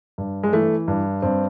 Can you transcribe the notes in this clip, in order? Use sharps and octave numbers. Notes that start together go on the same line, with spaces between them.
G2
G#3
E3 A3
G2
G2 C4